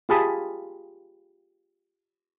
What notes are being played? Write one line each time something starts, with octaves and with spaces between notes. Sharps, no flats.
F4 G4 G#4 A5 B5 D#6